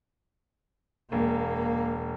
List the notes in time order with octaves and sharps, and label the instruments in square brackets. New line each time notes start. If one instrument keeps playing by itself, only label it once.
[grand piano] E1 [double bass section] A#3